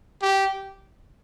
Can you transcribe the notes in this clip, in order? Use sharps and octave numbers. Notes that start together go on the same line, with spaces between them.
G4